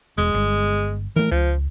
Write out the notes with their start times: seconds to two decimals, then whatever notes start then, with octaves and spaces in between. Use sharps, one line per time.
0.18 E1 G#3
0.34 G1
1.16 E3 A3 A#4
1.31 C#2 F3